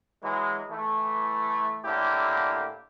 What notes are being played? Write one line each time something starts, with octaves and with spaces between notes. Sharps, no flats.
E3 F#3 G#3
E3 A3
A2 D3 A#3 E4 G4